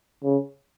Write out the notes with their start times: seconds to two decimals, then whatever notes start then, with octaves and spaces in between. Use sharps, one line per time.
0.24 C#3